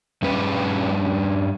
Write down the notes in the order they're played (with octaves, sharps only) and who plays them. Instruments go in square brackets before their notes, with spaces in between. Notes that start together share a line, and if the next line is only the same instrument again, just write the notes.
[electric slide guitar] G2 G3 C#4 B4